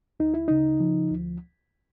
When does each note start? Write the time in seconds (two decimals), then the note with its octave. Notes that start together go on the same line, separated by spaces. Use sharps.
0.20 D2 D#4
0.34 E4
0.48 C#3 D#4
0.80 F3
1.10 D2